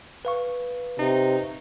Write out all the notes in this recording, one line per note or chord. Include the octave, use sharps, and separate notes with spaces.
B4 F5 C#6
C3 D#4